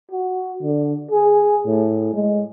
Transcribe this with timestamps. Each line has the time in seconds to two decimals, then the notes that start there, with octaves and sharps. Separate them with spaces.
0.11 F#4
0.63 D3
1.11 G#4
1.66 A2
2.14 G#3